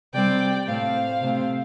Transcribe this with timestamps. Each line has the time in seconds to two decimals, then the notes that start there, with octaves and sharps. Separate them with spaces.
0.14 C3 G3 C4 D5 G5
0.67 A2 A3 C4 C5 F5
1.22 C3 A3 C4